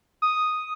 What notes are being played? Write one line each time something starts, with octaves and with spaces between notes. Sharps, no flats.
D#6